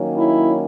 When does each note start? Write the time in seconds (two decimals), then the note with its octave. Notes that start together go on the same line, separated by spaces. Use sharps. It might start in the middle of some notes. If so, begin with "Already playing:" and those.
Already playing: D#3 F#3 A#3 C#4
0.17 E4